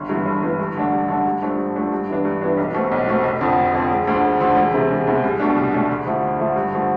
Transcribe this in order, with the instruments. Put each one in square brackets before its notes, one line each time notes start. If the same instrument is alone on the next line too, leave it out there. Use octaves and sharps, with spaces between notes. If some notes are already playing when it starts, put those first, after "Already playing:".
Already playing: [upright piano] G1
G2 E3 B3
G1
G2 E3 B3
G2
D3 A3 D4
G2
D3 A3 D4
G2
F3 A3 D4
G2
F3 A3 D4
G2
E3 B3 D4
G2
E3 B3 D4
B1
B2 A3 C4
B1
B2 A3 C4
F1
F2 D3 F3 C4
F1
F2 D3 F3 C4
E1
D2 D3 F3
E1
D2 D3 F3
E1
E2 C3
E1
E2 C3
C2
B2 A3 D4
C2
B2 A3 D4
D2
D3 F3 A3 E4
D2
D3 F3 A3 E4
G2
D3 F3 A3